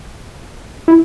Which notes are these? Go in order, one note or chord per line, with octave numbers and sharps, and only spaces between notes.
E4